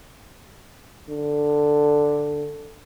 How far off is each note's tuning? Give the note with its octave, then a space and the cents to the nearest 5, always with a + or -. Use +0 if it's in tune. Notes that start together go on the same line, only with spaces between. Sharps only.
D3 +5